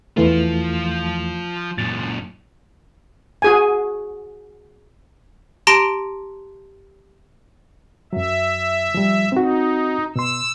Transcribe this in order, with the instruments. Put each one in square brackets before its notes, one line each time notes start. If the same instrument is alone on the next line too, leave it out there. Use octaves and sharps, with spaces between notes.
[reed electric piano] E2 E3 A3 [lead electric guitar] F3 F4
[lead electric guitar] F#2 A#2 [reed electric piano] A6
[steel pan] F#4 G#4 G#5
[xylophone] G4 A5 A#5 C6 A#6 D7
[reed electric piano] F#2 F#3 [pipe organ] E5
[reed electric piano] F3 G3
[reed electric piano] C4 F#4 [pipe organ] D#4
[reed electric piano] B2 C6 [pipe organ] E6